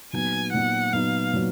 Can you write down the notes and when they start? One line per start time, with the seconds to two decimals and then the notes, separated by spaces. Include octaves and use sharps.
0.13 A#2 F#3 B3 D#4 G#5
0.53 A#2 F#3 B3 D#4 F#5
0.93 A#2 F#3 B3 D#4 F5
1.33 A#2 F#3 B3